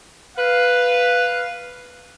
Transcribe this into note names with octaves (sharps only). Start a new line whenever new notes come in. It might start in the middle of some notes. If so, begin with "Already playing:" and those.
B4 F5